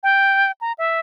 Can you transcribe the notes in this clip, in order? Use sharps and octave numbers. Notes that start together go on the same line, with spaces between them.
G5
A#5
E5